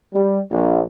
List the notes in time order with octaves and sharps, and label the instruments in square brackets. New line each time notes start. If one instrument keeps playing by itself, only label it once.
[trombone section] G3
A#1